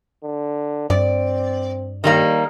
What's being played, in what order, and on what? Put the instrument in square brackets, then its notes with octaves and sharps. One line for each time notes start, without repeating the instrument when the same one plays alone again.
[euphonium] D3
[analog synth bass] G2 [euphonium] C4 [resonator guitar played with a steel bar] D5
[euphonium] D#2 [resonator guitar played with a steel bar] D#3 G3 A#3